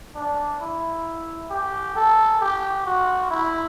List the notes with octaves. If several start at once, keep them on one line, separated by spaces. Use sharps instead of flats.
D4
E4
G4
A4
G4
F#4
E4